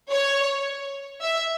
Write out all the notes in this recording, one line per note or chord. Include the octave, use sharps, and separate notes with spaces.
C#5
E5